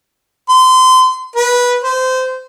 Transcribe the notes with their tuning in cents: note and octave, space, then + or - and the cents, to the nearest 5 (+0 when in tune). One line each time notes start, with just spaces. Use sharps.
C6 -30
B4 -15
C5 -25